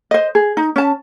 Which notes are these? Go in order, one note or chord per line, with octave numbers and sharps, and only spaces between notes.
C5 D#5
G#4
D#4
C#4 A5